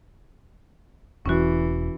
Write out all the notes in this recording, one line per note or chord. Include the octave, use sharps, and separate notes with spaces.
E1 E3 C#4 F#4